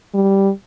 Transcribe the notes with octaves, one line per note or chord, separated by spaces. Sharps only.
G3